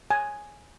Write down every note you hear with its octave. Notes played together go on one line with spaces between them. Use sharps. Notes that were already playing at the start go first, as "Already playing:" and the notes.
G#5